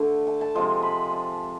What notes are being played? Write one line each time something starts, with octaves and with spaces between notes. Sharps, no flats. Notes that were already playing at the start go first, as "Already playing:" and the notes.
Already playing: D3 A3 A5
A5
A5
C3 F3 G#3
B5
A5